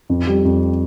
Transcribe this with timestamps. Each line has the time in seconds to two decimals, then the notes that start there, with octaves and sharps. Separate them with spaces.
0.10 F2
0.27 G3
0.45 F2